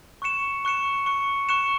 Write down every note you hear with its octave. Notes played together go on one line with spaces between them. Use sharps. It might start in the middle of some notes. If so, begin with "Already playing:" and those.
C#6 F#6 C#7 E7
C#6 F#6 C#7 E7
C#6 F#6 C#7 E7
C#6 F#6 C#7 E7